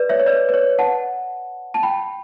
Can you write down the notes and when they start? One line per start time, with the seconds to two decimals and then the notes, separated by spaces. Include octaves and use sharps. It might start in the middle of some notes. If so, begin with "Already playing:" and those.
Already playing: B4 D5
0.09 C#5 E5
0.19 C#5
0.26 B4 D5
0.49 B4
0.54 C#5
0.79 F#5 A5
1.74 A5
1.83 G5 B5